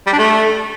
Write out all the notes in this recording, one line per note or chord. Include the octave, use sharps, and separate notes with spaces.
G3
D4
A3